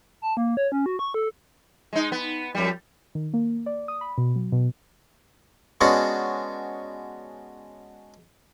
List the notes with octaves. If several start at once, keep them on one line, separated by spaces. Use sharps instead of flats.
A5
A#3
C#5
C#4
F#4
C#6
A4
G#3 D#4
B3
F2 G3
D#3
A#3
D5
D#6
B5
B2
F#3
B2
G#3 B3 C#4 D4 F#4 F#5